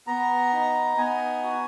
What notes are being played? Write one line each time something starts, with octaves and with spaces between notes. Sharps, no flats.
B3 A#5
D#4
B3 G#5
F#4